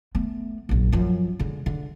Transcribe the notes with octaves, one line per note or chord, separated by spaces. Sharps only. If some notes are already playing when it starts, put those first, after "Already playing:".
A3 B3
A#1 F#2
F#2 F3
D3 G#3
D3